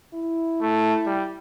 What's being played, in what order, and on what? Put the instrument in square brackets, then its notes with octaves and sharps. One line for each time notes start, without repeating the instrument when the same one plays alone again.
[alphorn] E4
[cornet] A3
G3